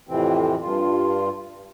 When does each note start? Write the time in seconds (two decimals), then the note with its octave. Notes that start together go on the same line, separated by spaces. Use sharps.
0.08 F2 A2 C3 E3 C4
0.62 G2 F4